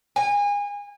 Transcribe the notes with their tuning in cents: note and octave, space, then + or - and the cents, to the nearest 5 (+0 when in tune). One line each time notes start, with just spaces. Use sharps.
G#5 -30